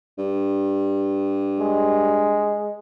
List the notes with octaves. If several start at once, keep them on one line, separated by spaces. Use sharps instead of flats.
G2
G#3